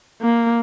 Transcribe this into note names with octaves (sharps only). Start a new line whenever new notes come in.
A#3